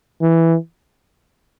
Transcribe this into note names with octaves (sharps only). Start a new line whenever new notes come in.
E3